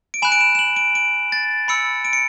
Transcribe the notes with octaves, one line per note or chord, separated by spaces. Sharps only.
D7
G#5 B5 F#6 E7
D7
E7
E7
F#7
D7
D7
A6
B5 E6 C#7
D7
C#7